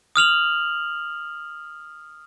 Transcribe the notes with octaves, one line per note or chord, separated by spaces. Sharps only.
D#6 F6 F7 F#7